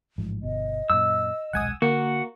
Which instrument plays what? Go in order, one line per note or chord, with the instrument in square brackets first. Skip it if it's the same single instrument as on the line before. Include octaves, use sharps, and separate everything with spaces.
[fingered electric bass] A1 G#2 F3
[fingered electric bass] G1 B2 [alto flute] D#5
[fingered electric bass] F#2 A#2 [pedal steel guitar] E6
[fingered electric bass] D#1 B1 G#3 [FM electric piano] F#5 G#5 D#6
[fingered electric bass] D3 [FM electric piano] A#3 [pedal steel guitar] F#4